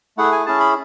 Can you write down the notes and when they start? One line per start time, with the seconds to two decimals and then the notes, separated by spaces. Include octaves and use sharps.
0.18 A3 E4 G#4 F#5
0.32 G#5
0.46 C#4 E4 G#4 A5
0.60 B5